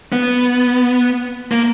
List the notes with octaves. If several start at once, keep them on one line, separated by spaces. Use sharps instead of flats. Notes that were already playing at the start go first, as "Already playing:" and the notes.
B3
A#3